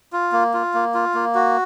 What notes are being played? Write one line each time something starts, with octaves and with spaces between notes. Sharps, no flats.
F4
A#3
F4
A#3
F4
A#3
F#4